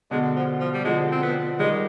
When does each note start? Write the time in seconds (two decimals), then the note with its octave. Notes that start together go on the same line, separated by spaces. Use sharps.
0.11 B2 D3 G#3
0.36 F3
0.60 F3
0.74 G3
0.85 D3 F3 G#3
1.12 C4
1.22 B3
1.59 D#3 G3 G#3